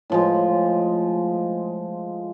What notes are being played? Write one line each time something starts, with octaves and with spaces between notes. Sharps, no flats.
A2 F3 G#3